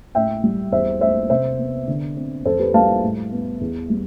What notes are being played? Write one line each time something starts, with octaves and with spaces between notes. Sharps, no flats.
A2 E5 G5
G3
E2 C5 E5
A3 C5 E5
C3 C5 E5
B3
D3
C4
F2 A4 C5
G4 B4
G3 F5 A5
A2
B3
E2
G3